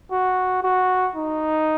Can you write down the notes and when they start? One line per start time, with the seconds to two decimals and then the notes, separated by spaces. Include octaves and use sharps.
0.11 F#4
0.63 F#4
1.15 D#4